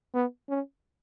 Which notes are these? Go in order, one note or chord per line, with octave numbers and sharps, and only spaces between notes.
B3
C#4